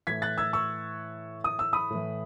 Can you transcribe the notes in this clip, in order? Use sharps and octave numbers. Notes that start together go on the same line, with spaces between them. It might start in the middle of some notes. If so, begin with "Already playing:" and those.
A2 E3 G#6 B6
F#6 A6
E6 G#6
C#6 E6
D#6
E6
B5 D#6
A2 E3